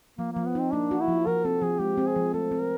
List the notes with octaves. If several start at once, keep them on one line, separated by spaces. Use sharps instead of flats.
F3 A#3
F3 A#3
B3
C4 D#4
A#3 D4
F#4
E4
F3
F3 A#4
C4 A4
F3 G#4
G#3 G4
C4
G#4
F3
A3 A4
C4
A#4